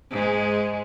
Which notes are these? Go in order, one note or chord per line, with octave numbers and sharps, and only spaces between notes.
G#2 G#3